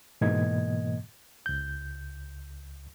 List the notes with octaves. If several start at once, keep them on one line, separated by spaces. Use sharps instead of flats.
G#2 B2 E3 A#3 D#5 G#6
C#2 G6